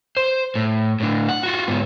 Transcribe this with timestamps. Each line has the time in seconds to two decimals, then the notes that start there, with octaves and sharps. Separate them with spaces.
0.17 C5
0.55 A2
1.00 A2 D4
1.29 F#5
1.43 F4 F#4
1.68 G#2 B3